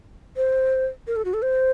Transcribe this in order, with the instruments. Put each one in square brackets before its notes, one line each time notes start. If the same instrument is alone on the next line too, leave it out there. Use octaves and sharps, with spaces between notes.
[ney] C5
A#4
A4
F#4
A4
C5